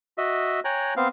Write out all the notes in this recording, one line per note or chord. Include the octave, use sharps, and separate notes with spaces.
F#4 D#5 E5
C#5 G5 G#5 A#5 F#6
B3 C4 F5